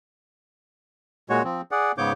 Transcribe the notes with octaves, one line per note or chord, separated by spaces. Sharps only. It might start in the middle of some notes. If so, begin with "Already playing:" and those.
A#2 G#3 F#4 C#5
F3 C4
G#4 D5 F#5
G#2 C#3 B3 C#5 D6 G6